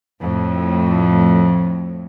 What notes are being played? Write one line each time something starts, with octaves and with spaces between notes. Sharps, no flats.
F2 A2